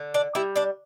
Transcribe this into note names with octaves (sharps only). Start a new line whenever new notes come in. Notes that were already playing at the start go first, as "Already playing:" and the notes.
Already playing: D3
D4 D5
G3 E4 E5
D4 D5